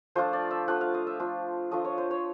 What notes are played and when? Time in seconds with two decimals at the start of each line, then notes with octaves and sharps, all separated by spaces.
0.15 F3 A3 D4 F4 C5
0.33 D5
0.51 E5
0.68 F3 A3 D4 F4 F#5
0.81 F5
0.94 D#5
1.07 E5
1.20 F3 A3 D4 F4
1.71 F3 A3 D4 F4 D#5
1.85 C#5
1.98 C5
2.11 C#5